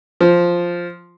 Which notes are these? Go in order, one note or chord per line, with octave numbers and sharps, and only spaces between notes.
F3